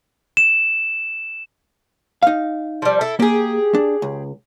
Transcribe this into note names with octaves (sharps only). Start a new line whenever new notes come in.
E7
D#4 F5
F3 G3
E4 A4
A#3 G4 G#4
D4
C#2